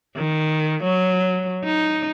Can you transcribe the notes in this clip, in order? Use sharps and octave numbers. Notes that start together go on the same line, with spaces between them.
D#3
F#3
D#4